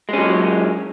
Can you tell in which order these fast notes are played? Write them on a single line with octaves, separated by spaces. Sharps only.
G#3 C#4 F#3